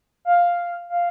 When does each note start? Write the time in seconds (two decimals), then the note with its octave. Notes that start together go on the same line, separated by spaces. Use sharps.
0.25 F5
0.90 F5